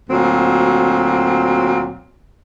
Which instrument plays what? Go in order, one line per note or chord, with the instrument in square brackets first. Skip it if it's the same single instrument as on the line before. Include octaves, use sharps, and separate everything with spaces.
[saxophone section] D2 A#2 F#3 C4